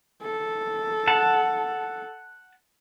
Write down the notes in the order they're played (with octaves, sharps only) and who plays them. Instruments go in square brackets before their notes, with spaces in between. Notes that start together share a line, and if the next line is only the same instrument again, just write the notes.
[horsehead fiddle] A4
[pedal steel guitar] F#5 A5